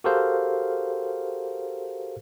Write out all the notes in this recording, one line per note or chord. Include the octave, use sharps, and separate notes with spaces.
F#4 G4 A4 A#4 C5 F5